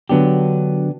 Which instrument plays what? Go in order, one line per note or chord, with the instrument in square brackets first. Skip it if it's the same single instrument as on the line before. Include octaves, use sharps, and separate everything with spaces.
[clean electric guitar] D3 F#3 B3 D4 G4